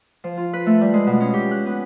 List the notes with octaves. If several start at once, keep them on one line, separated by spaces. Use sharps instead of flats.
F3
F4
B4
A3
G3
G#3
B2
C#4
G4
F#6
B3